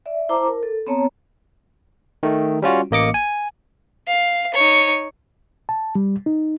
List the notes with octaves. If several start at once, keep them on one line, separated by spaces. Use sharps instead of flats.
D5 E5
E4 C5 A5 A#5 D6
A#4
A4
B3 C4 C#5 A5 A#5
D#3 A3
G3 C#4 F4 F#4
A1 A#3 D#5 D6 C#7
G#5
F5
D#4 C#5
A5
G3
D#4